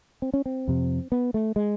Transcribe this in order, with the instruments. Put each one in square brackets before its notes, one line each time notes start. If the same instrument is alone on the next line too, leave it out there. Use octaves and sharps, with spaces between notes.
[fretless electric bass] C4
C#4
C4
F2 C3
B3
A3
G#3